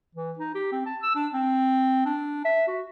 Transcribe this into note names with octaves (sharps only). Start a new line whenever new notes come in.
E3
D#4
G4
C4
A5
E6
D4
C4
D4
E5
F#4